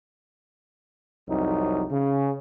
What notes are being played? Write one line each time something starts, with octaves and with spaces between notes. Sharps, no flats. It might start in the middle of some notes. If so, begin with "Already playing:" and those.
C2 F2 F#3 D#4
C#3